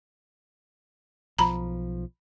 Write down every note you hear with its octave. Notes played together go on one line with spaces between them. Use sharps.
B1 F3 A#5 B5